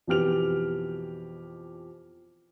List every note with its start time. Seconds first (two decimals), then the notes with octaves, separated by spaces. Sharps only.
0.07 F2 B2 E3 G4 F6 F7